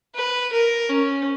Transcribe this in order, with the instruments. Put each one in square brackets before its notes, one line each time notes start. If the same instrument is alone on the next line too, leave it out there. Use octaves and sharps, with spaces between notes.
[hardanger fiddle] B4
A#4
C#4